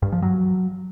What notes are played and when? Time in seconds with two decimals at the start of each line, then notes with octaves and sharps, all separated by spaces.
0.02 G2
0.12 F3
0.22 F#3